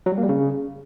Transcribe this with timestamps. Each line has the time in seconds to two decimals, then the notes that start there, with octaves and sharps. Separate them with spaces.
0.06 F#3
0.12 G3
0.18 A#3
0.23 G3
0.29 C#3